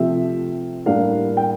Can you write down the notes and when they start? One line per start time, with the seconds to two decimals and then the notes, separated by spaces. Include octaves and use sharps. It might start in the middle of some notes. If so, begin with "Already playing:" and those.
Already playing: C3 F3 A3 C4 E5
0.86 A2 G3 A#3 D4 F5
1.37 G5